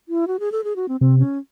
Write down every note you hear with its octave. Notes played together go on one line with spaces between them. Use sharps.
E4
F#4
G#4
A4
G#4
F#4
C4
C3 C4
C#4